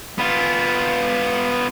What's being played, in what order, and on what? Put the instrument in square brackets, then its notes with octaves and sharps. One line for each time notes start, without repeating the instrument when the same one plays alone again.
[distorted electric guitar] B3 F4